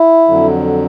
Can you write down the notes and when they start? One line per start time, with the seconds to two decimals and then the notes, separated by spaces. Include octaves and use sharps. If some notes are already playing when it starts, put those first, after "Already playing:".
Already playing: E4
0.28 F2 D3 F#3